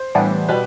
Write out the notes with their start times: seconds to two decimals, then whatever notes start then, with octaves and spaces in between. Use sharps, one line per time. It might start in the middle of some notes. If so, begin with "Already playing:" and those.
Already playing: C5
0.15 A2 E3 G3 B3 D4
0.49 B2 G3 B4